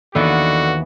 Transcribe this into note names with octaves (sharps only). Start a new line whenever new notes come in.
D#2 D3 E3 B3 F#4